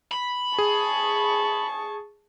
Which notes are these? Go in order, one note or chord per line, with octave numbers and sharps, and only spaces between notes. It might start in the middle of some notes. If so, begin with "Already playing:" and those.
B5
G#4 A5 C#6